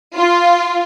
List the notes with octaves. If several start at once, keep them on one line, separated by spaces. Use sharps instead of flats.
F4